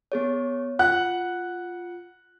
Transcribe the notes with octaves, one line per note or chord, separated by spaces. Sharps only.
B3 G#4 C#5
F4 F#5 F#6